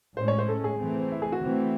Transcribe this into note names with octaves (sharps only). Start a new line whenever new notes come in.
A2 G#3 C#4 C5
C#5
C5
A4
G#4
E3 A3 C4
E4
G#4
F#4
E3 A3 C4